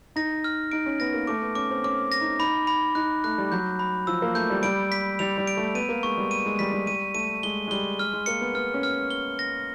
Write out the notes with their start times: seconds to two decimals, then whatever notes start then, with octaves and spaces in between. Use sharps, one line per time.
0.16 D#4 A#6
0.44 F6
0.72 D#4 D7
0.86 C#4
1.00 B3 A#6
1.14 A#3
1.27 A3 D6
1.42 B3
1.55 C#4 D6
1.70 C4
1.84 C#4 D6
2.12 A#6
2.21 D#4
2.40 D#4 B5
2.67 B5
2.95 D#4 F#6
3.24 A3 F#6
3.38 G3
3.52 F#3 G6
3.79 B5
4.07 F3 E6
4.22 A#3
4.35 A3 G6
4.50 G3
4.63 G3 D7
4.92 B6
5.19 G3 F7
5.38 G3
5.47 D7
5.57 A3
5.75 B3 D#7
5.89 A#3
6.03 G#3 C#6
6.17 G3
6.31 D#7
6.46 G#3
6.59 G3 B6
6.72 G3
6.87 G3 D#7
7.14 A3 D#7
7.43 G#3 G7
7.67 G#3
7.71 G3 G7
7.99 G#3 F6
8.13 G#3
8.26 A#3 C#7
8.41 B3
8.54 B3 F6
8.74 C#4
8.83 F6
9.10 G7
9.39 A#6